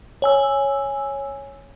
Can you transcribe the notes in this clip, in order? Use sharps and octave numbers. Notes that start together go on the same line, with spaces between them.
C#5 G#5 E6